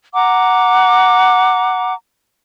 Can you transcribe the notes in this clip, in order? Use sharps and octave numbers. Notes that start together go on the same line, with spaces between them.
F#5 A#5 D6